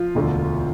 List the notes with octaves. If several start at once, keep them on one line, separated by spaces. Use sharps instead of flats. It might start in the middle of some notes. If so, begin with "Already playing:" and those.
Already playing: F3 F4
E1 D2 D3